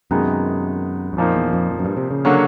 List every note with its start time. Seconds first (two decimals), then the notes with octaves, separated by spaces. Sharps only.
0.11 F#2 C3 D#3 G#3 B3 D#4
1.13 F#2
1.17 F2 A#2 F3 A#3 D#4
1.36 E2
1.53 F2
1.71 F2
1.79 F#2
1.85 G2
1.97 C3
2.11 C#3
2.25 D3 F#3 A#3 C#4